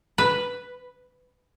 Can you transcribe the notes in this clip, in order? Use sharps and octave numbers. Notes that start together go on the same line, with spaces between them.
B4